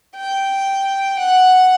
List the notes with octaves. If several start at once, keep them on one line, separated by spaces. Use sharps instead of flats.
G5
F#5